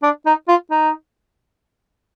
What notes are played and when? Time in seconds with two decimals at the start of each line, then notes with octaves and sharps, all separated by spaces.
0.03 D4
0.26 D#4
0.48 F4
0.71 D#4